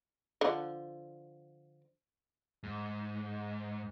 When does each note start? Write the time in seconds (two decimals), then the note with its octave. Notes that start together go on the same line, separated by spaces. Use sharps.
0.41 D3 F3
2.63 G#2